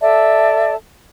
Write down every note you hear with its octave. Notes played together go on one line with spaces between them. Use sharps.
A4 D5 E5 A5